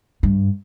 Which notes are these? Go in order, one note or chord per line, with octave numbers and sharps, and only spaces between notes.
G2